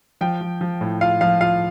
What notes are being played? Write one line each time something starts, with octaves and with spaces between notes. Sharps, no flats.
F3 G5
F3
F3
A2
F4 F5
F3 F5
F4 F5